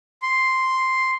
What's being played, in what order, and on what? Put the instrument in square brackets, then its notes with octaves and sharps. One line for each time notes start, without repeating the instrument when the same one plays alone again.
[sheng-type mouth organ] C6